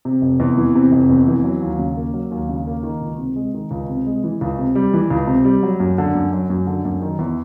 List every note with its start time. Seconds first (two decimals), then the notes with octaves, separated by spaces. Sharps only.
0.05 C3
0.22 F1
0.40 E2
0.57 E3
0.75 C3
0.92 F1
1.09 E2
1.28 E3
1.44 F#3
1.62 D#2
1.79 C#3
1.97 A#3
2.14 F#3
2.31 D#2
2.49 C#3
2.67 A#3
2.83 D#3
3.02 C#2
3.18 C3
3.36 G#3
3.54 D#3
3.71 C#2
3.89 C3
4.06 G#3
4.24 E3
4.41 C#2
4.59 C3
4.75 G3
4.94 E3
5.11 C#2
5.27 C3
5.45 G3
5.63 F#3
5.80 F#2
5.98 D3
6.15 F#2
6.33 F#3
6.50 F#2
6.67 D3
6.85 F#2
7.02 D#3
7.19 E2